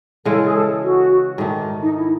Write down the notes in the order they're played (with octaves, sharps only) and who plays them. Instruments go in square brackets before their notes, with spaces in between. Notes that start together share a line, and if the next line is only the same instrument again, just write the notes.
[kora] C#3 E3 G#3 [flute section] A4
[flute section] G#4
A4
F#4
[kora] G#2 D#3 A3
[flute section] D#4
E4